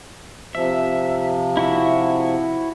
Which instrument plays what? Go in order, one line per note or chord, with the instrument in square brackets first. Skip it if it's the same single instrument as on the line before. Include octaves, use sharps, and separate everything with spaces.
[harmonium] C3 F3 [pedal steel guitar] E5
[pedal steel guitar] E4 F#4 E5